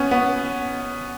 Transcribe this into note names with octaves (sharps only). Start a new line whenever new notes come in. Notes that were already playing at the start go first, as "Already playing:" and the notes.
Already playing: B3 C#4
B3